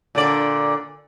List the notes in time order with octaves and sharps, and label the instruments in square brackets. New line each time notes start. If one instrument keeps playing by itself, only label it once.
[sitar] A#2 D3 D5